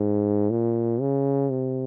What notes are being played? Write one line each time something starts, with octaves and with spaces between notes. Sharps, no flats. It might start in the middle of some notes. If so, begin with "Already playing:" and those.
Already playing: G#2
A#2
C#3
C3